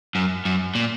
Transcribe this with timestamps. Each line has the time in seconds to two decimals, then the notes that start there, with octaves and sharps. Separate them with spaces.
0.15 F#2
0.45 F#2
0.75 A#2